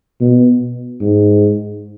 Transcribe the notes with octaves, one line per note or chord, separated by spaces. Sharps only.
B2
G#2